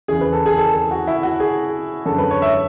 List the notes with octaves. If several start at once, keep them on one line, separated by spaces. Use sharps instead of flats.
E2 C#3 E3 G#4
B4
A4
G#4
A4
A4
F#4
E4
F#4
G#4
F#2 D3 G#3 A4
B4
C#5
E5